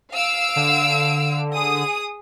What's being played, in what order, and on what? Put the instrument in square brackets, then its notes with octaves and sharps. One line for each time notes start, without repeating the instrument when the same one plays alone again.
[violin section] F5 E6 D7
[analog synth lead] D3
[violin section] G#4 D#6